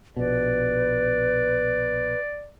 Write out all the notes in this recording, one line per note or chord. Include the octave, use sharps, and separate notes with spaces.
A#1 B2 B4 D5